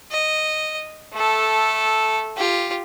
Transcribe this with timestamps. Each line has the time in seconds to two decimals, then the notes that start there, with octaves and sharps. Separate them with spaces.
0.11 D#5
1.13 A3 A4
2.37 F4 G4